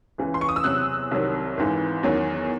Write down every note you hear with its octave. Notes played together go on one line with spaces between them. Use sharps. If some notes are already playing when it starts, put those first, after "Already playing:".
C#2 C#3 E3
C6
C#6
D#6
E6
E2 C3 F#3 F#6
C2 C3 D#3 F#3
G#1 G#2 E3
E2 D#3 F#3